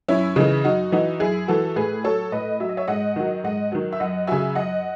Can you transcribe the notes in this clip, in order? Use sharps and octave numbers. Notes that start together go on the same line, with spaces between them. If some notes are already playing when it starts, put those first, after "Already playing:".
F#2 C#4 E4
C#3 E3 D#4
F#2 D#4 F#4
E3 D#4 F#4
F#2 E4 G#4
E3 F#4 A4
A2 G#4 B4
F#3 A4 C#5
A2 B4 D#5
F#3 E5
D#5
C#5 E5
G#2 D#5 F#5
D#3 F#3
G#2 D#5 F#5
D#3 F#3
E5
F#2 D#5 F#5
C#3 F#3 E5 G#5
F#2 D#5 F#5